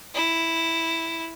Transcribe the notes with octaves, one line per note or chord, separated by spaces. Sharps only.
E4